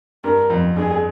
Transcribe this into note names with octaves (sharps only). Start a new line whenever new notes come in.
G2 A#4
F2
G2 G#4